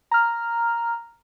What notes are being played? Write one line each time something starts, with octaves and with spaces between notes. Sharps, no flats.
A#5 F6